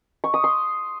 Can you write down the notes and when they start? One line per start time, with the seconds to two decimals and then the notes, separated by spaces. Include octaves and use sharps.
0.24 C#6
0.34 D#6
0.44 C6